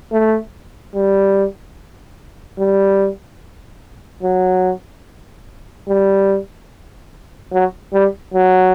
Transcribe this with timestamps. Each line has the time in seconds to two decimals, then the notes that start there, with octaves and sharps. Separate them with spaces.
0.12 A3
0.95 G3
2.59 G3
4.23 F#3
5.89 G3
7.52 F#3
7.93 G3
8.34 F#3